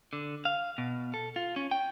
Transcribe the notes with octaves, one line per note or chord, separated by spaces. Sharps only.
D3
F5
B2
A4
F4
C#4
G5